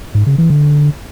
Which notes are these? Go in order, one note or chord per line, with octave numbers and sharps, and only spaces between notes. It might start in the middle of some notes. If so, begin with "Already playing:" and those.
G#2
C#3
E3
D3